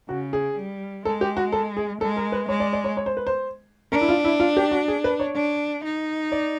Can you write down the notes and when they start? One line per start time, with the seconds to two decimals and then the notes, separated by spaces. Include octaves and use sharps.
0.09 C#3 F#4
0.33 G#4
0.57 G3
1.05 G#3 A4
1.21 G4
1.37 F#4
1.52 A4
1.77 G#4
2.01 G#3 A4
2.17 A#4
2.32 B4
2.48 G#3 C#5
2.60 D5
2.73 D5
2.84 C#5
2.97 C#5
3.06 C5
3.17 B4
3.27 C5
3.92 D4 A#4
4.01 E4
4.09 F4
4.25 E4
4.40 F4
4.57 G4
4.71 F#4
4.88 G#4
5.04 B4
5.20 C#5
5.35 D4
5.84 D#4
6.32 D5